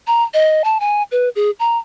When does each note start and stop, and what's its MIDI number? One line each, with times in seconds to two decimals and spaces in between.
0.07 0.23 82
0.34 0.62 75
0.64 0.80 81
0.80 1.03 80
1.12 1.29 71
1.36 1.51 68
1.60 1.78 82